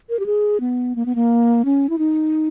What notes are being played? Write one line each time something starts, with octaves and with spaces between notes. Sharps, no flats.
A#4
G4
G#4
B3
A#3
B3
A#3
C#4
E4
D#4